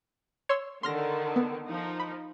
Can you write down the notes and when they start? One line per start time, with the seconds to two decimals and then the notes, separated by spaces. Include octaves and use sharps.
0.49 C#5 C6 E6
0.83 D3 D#3 C6 F6 A#6
1.36 B3
1.67 F3 D#4
2.00 B5